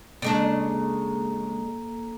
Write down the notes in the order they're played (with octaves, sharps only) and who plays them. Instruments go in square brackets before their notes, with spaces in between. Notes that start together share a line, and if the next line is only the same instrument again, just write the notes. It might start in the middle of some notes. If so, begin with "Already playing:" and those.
[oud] C#3 G#3 D4 [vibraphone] A#3 A4 A#5